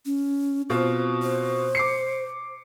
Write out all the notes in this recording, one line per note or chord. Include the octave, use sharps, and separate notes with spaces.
C#4
B2 C4 F4 C5
C5
D6 C7 C#7